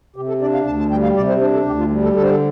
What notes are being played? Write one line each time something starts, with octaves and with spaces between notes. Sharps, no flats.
C3 G4
A4
D4 D5
F5
D2 A5
A5
G3 G5
F5
C3 D5
C5
D4 C5
A4
D2 G4
F4
G3
A4
D3 A4
C5
A4